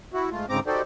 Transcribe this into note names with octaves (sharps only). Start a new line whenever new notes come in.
E4 F#4
G#2 A3 F4
D2 G#2 C#3 C4 A#5 D6
D#4 F#4 G4 A4 C5 D5